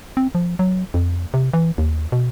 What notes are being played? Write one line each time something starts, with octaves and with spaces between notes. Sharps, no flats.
C4
F3
F#3
F2
C3
E3
D#2
B2